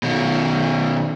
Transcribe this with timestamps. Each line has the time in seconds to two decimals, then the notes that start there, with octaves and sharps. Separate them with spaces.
0.03 B2 D#3